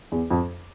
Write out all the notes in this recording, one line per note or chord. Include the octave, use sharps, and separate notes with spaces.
E2
F2